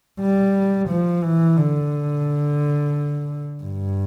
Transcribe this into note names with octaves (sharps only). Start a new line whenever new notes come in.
G3
F3
E3
D3
G2